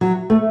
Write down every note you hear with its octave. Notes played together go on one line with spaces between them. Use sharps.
F#3
A3